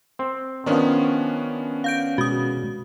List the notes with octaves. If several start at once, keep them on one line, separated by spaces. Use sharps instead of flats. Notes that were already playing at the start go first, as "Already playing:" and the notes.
C4
D#3 F3 B3 C#4 D4
F5 G6 D7
B2 G#3 F#4 D#6